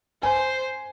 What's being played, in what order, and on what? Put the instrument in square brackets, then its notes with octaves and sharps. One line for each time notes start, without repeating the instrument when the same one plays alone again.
[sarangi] C5 [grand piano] G#5